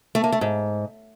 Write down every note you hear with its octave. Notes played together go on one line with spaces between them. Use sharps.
A3
A#3
A3
G#2